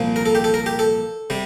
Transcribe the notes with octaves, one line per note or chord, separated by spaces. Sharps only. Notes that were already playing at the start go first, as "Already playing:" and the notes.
Already playing: C2 A#2 F3 A#3
A#4
A4
G4
A4
A#4
G4
A4
C3 G3